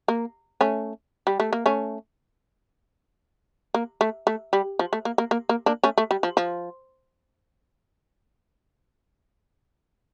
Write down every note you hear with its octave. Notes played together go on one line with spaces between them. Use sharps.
A#3
A3 C#4
G3
A3
A#3
A3 C#4
A#3
A3
A3
G3
F3
A3
A#3
A#3
A#3
A#3
A#3 D4
A3 C#4
A3
G3
F3
F3